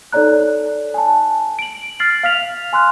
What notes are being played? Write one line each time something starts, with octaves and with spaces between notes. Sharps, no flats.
D#4 A4 C#5 D5 A#5 F#6
G#5 A5
D7 F#7
F6 A6 C7 F#7
F5 F6 B6 F7
G#5 C6 F6 F#6